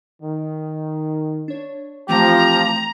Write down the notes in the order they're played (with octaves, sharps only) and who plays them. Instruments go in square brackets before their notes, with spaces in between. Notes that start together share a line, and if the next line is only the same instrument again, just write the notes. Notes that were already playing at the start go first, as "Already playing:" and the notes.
[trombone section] D#3
[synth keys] D4 C#5
[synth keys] E3 A3 C4 [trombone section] F3 [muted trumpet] G4 [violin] A#5